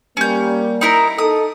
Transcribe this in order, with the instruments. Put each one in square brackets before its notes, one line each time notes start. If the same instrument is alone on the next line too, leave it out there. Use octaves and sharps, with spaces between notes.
[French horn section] G3 A#3 [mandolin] C#4 G6
[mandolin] D#4 E4 A#4
[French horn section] D#4 A4 [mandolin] D#6